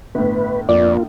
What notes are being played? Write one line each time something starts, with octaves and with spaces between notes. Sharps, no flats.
G1 A2 B4
F2 A#3 F4 D5